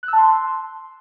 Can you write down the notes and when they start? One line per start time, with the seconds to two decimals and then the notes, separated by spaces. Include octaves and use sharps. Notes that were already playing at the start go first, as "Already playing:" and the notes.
0.03 F#6
0.08 E6
0.13 A5
0.18 C6